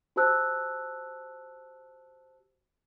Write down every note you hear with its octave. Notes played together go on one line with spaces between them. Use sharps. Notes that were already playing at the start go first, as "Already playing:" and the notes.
F#4 G4 C5 A5 E6 F#6